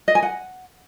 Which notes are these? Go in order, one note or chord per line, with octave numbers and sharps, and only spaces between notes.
D#5
G#5
F#5